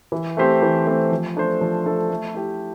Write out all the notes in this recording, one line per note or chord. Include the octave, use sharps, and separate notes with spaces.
E3
A3 C4 G4 C5
E3
A3 C4 G4 C5
F3
A3 D4 A4 C5
F3
A3 D4 A4 C5
A3
E4 G4